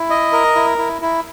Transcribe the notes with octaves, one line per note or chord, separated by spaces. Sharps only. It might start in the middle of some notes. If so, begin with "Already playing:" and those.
Already playing: E4
D#5
A#4
E4
E4
E4